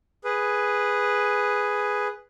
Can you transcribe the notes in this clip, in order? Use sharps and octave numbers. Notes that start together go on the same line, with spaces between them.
G#4 B4